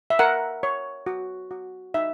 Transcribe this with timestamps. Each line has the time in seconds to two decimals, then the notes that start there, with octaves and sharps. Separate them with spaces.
0.10 E5
0.19 A#4 F#5
0.63 C#5
1.06 F#4
1.51 F#4
1.94 D#4 E5